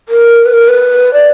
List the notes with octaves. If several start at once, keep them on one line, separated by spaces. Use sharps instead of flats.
A#4
B4
A#4
B4
D5